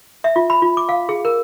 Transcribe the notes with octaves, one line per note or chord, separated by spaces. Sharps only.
E5
F4
B5
F4
D6
F5
G#4
A#4